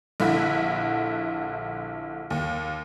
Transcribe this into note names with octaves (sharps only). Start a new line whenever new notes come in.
A#1 D3 E4
D#2